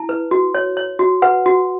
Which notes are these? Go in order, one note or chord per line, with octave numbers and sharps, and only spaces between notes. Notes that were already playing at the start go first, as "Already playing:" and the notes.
Already playing: E4 A5
B4
F#4
C#5
C#5
F#4
B4 F#5
F#4